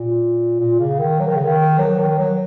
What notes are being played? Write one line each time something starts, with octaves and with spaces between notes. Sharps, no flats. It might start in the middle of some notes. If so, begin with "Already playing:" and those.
Already playing: A#2
A#2
C#3
D#3
F#3
D#3
C#3
D#3
F#3
D#3
F#3